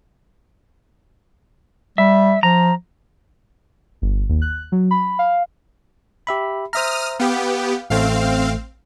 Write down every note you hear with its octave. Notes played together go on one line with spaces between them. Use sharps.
G3 E5
F3 A#5
G1
D#2
F#6
F#3
B5
F5
G4 E5 B5
C5 E5 A#5 D#6 F6
B3 G4 F5
A1 A3 C4 F5